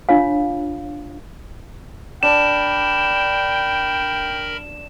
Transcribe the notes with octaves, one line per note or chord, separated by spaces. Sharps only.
D4 F4 C#5 F5
D4 A#4 G5 B5 E7